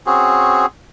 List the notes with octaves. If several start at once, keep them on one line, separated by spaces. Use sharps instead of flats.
C4 C#4 F#4 G#4